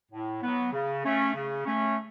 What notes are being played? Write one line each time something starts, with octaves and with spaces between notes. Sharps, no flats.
A2
F#3 B3
C#3
A3 C#4
C#3
A3 C#4